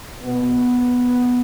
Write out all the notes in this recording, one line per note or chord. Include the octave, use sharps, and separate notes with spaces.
B2 B3